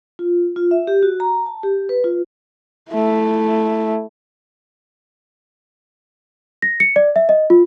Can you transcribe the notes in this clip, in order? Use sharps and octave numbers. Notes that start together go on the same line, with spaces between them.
F4
F4
E5
G4
F#4
A#5
A5
G4
B4
F4
A3 E4
A#6
C#7
D5
E5
D#5
F4